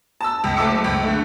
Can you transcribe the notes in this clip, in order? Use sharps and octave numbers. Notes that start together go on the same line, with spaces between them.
A5 E6
C#2
F#1 A3 A5 D6 E6 C#7
C#2
D3 A3